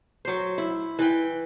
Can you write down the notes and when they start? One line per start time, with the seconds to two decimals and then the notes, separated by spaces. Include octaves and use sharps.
0.25 F#3 C5
0.58 E4
0.99 E3 B4 G5